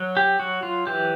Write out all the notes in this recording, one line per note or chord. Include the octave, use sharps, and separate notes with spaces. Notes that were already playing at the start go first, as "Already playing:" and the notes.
Already playing: F#3
G4
F#3 F#4
F4
E3 G4